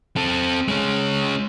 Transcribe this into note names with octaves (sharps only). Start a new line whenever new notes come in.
C4 A4
G#3 C#4